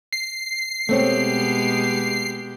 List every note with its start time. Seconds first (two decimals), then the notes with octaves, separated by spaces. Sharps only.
0.13 C7
0.89 B2 G#3 A3 C4 G4 C#5